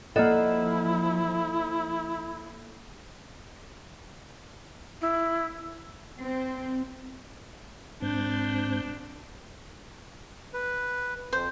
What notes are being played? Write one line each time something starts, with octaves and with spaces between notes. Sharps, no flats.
F3 A#3 E4 A4 D5 D#5 F#5
E4
C4
G#2 C4 D4 G6
B4
F2 C5